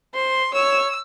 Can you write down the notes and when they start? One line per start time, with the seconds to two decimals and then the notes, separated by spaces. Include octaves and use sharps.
0.14 C5 C6
0.53 C#5 E6